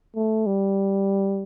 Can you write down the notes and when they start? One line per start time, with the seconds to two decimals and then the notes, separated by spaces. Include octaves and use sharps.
0.16 A3
0.46 G3